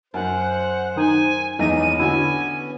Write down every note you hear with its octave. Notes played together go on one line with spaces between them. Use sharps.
F#2 C5 F#5
D#3 D#4 G#5
G#1 E2 B3 C#4 D#4 A#6 D#7
D3 E4 F#4 G#5